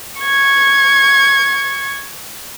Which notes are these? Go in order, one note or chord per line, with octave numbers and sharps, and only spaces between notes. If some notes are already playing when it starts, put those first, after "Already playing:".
C#6 G#6